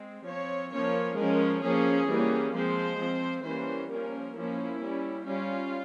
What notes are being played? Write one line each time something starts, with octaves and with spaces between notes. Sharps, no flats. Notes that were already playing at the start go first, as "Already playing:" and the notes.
Already playing: G#3 C4
F3 C4 C#5
F3 A#3 C#4 C#5
F3 G#3 C#4 A#4
F3 A#3 C#4 G#4
E3 G3 A#3 C#4
F3 G#3 C4 C5
F3 C4
E3 G3 A#3 C#4 C5
F3 A#3 C#4 A#4
F3 A#3 C#4 E4
G3 C#4
G3 C#4 F4